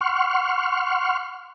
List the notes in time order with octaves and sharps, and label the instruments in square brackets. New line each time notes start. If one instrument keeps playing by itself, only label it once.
[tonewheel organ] F#5 C6 C#6 F6